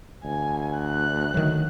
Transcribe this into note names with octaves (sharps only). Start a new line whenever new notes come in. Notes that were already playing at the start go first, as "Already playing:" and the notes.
D2 G#5
F#6
D2 D#3 F#3